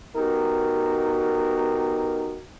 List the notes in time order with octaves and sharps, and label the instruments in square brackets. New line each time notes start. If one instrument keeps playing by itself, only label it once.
[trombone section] B3 D#4 F#4 G4 A#4